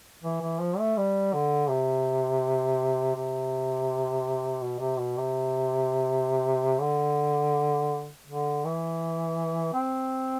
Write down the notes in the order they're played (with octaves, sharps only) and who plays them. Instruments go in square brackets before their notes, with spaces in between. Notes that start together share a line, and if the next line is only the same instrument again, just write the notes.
[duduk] E3
E3
F3
A3
G3
D3
C3
C3
B2
C3
B2
C3
D3
D3
E3
C4